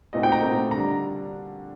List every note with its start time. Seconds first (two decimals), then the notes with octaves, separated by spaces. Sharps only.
0.13 A#2 A3 C4 D#4 F#4 D#5
0.23 G5
0.32 A#5
0.42 A#2 A3 C4 D#4 F#4
0.71 D3 G3 D4 A#5